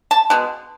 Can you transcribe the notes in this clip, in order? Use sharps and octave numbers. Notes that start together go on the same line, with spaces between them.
A5
B2 G#3